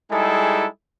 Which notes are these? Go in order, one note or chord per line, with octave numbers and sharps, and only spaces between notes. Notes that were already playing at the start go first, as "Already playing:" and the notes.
G3 G#3 D#4 E4 G#4 A4